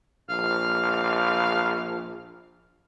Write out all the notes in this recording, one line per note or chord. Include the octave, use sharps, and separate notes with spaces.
A#1 F5